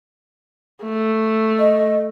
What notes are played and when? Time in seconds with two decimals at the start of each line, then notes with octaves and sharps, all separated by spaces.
0.84 A3
1.59 D#5